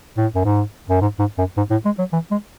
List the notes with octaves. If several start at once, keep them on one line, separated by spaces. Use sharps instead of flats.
A2
F#2
G#2
F#2
G#2
G#2
F#2
G#2
A2
G#3
F#3
E3
G#3